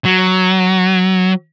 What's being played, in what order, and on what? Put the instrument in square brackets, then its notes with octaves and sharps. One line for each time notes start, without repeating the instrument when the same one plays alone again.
[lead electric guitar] F#3